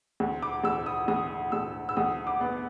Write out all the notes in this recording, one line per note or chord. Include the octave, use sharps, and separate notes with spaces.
D2
D6
D2 E6
D#6
D2 D#6
D2 E6
E6
D2 D#6
D6
B3